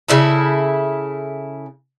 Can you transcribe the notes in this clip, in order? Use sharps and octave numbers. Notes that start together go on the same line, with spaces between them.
C#3 E4 A4